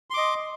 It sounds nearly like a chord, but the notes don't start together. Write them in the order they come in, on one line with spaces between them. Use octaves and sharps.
C6 D6 D#5